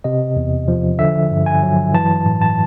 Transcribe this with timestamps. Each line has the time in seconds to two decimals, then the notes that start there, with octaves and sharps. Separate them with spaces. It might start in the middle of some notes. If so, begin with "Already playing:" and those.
0.04 C3 D#5
0.36 E2
0.68 F3
0.99 D3 E5
1.31 G2
1.46 G#5
1.63 F#3
1.94 E3 A5
2.25 A2
2.42 A5